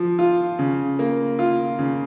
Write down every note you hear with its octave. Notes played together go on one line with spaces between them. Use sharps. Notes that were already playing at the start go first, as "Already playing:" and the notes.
Already playing: F3
F4
C#3
A#3
F4
C#3